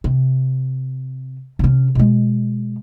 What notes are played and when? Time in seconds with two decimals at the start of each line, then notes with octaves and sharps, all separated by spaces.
0.04 C3
1.59 C3 C#4
1.95 B2 G#3